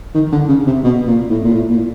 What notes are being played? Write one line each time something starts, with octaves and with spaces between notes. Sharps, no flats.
D#3
D3
C#3
C3
B2
A#2
A2
A#2
A2
A#2